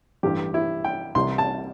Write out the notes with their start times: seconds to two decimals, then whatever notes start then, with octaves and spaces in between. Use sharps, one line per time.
0.23 A1 G2 E3 G4
0.54 E4
0.84 G5
1.15 C2 C3 E3 C6
1.38 A5